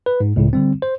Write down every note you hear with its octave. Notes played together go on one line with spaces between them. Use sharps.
B4
G#2
C#2 A2 C#3
D3 G3 C4
C5